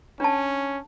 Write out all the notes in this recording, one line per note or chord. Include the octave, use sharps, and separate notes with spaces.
C#4 D4 A5